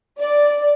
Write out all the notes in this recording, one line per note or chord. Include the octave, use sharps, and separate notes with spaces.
D5